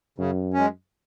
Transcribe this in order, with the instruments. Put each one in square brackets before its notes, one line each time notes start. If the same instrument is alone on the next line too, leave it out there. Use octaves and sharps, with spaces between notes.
[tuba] F#2 [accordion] C#3
[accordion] G#3 C#4